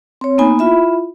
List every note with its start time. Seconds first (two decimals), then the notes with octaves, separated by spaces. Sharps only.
0.21 C4 C#5
0.38 A#3 B3 D#4 G#5 B5
0.59 E4 F4 E5 B5